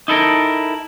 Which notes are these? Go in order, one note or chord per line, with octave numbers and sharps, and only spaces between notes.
D#4 E4 A4 A#4